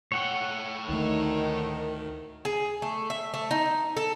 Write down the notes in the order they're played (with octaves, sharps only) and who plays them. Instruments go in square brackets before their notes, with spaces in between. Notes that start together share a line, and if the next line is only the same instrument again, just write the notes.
[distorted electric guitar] A2 G5 [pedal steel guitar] C#5 F#5
[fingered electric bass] D2 A3 [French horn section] D#3
[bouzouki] G#4
A3
E5
A3
D#4
A4